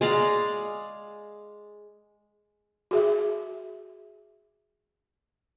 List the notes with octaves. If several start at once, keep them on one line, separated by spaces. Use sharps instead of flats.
G#3 D5 F5 A#5
F#4 G#4 E5